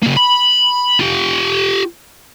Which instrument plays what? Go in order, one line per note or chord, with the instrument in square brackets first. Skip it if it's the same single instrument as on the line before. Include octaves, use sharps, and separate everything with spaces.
[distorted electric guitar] C#3 A#3
B5
F4 G4